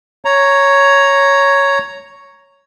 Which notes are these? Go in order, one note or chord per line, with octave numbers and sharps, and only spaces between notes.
C#5 A#5